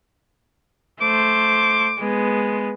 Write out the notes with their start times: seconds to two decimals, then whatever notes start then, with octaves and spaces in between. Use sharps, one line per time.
1.01 A3 C5 D6
1.99 G#3 B3